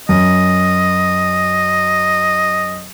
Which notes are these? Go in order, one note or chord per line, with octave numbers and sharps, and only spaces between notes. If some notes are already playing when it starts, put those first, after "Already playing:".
F#2 D#5